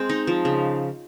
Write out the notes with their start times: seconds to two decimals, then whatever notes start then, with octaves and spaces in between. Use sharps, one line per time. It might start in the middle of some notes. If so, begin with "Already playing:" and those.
Already playing: G#3 C4
0.09 D#4
0.27 F3
0.45 C#3